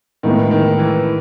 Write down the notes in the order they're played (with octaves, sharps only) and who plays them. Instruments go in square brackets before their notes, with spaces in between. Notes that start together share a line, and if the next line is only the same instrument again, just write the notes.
[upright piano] A2 G#3 B3 [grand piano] D#3
[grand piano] D#3
E3